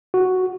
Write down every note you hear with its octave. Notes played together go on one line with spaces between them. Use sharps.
F#4